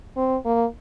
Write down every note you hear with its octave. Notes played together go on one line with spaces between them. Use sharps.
C4
A#3